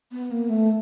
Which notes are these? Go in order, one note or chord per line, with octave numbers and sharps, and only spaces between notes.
B3
A#3
A3